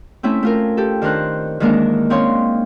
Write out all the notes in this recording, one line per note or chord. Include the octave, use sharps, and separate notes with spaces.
A3 C4 C#4 E4 E5
A3 F4 A#4
G4 A4
D#3 D4 A#4 C5 F#6
D#3 E3 G#3 A#3 D4 A#4
C4 C#4 D#4 C#5 F5 C6